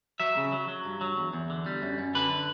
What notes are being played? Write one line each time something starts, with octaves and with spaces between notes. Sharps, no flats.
F#3 E5
C#3
F#3
F#3
G2
F#3
E2
E2
D3
G3
F#2
F#2
D3 B4